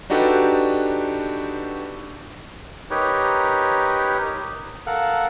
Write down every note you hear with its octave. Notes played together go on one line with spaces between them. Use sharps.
D4 D#4 F#4 G4 A4 B4
D#4 G4 A#4 B4 C#5
A4 A#4 F5 F#5